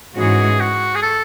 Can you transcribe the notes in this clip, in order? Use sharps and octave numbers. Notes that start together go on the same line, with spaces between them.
G#2 E3 G#3 C#4 F#4 G#4
F#4
G#4
A4